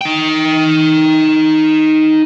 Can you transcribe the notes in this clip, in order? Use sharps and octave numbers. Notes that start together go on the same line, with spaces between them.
D#4 G5